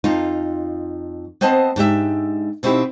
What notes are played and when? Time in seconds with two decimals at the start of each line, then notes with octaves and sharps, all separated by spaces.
0.04 F2 D#4 F4
1.41 B3 C4 C5 D#5 A5
1.76 G#2 D4 G4 E5
2.63 B2 C4 D#4 E4 G4